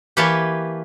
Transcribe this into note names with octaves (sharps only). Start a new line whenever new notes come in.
E3 A#3 G4 B4 C#5 A5